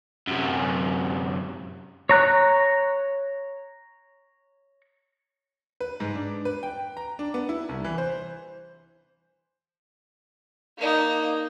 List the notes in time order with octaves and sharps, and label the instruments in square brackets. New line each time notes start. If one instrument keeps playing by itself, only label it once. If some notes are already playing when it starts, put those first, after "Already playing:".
[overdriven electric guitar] F#2 C3
[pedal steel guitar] C#5 A#5 F#6
[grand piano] B4
G#2
D4
B4
G5
A#5
D4
B3
E4
C2
E3
C5
[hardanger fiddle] A#3 D#4